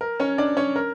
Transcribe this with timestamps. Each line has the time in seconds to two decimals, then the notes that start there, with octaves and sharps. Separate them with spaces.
0.01 A#4
0.20 C#4 C#5
0.38 D4 D5
0.57 C#4 C#5
0.76 A#4